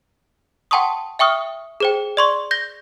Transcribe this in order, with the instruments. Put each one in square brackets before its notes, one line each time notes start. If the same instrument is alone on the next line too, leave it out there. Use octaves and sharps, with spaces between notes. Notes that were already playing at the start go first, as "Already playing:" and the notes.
[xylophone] F#5 G5 A5 C6 C#6 D#6
E5 G5 C#6 D#6 F6
G#4 C5 G5
D5 C6 C#6
G6 A#6 G7